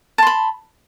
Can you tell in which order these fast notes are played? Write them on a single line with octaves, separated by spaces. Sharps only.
A5 C6 B5